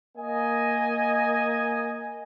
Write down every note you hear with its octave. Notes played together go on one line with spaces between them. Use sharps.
A#3 D#5 G#5